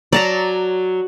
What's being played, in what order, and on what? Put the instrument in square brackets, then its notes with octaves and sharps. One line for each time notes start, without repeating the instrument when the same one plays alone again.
[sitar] F#3 [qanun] D5 A5 A#5